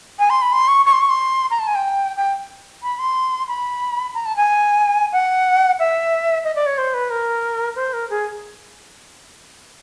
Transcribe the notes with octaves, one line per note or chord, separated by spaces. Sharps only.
G#5
C6
B5
C6
C#6
C#6
C6
C#6
C6
A#5
A5
G#5
G5
G5
B5
C6
B5
A#5
A5
G#5
F#5
E5
D#5
D5
C#5
C5
B4
A#4
C5
A#4
G#4